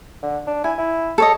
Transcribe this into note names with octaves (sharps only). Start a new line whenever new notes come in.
D3
D4
E4 G#5
E4
A4 C#5 D#5